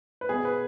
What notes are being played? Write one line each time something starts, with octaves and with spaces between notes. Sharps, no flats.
B4
B2 G#4
B4